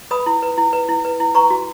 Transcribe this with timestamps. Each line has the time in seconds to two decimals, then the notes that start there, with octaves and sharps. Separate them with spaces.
0.11 B4 B5 D#6
0.26 E4
0.42 B4
0.58 E4
0.73 B4
0.89 E4
1.05 B4
1.20 E4
1.35 B4 A#5 C#6
1.50 F#4